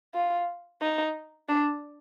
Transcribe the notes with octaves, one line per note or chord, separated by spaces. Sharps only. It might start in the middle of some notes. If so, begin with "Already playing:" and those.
F4
D#4
D4